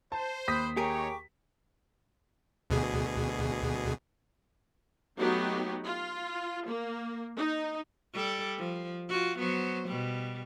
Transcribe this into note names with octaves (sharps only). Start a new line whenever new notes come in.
C5 A5
D#2 B5 D#6 F#6 G6 B6
D#4 G4 G#4 A#4 C#5 G5 C#6 D6
D2 B2 G#4
F#3 A3 B3 D#4 G4
F4
A#3
D#4
G3 A4 D5
F3
F4 F#4
F#3 B3 C5
B2 G3